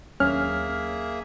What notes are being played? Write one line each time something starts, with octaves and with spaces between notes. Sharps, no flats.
D#2 F#3 A#3 C#4 D4 G#4 E5 F6